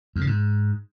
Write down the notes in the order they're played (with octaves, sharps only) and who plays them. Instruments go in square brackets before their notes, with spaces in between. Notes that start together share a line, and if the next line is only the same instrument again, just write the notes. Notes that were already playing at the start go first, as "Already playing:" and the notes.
[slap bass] E2
C#3
G#2